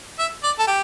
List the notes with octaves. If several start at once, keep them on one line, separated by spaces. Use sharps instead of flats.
E5
D5
A4
G4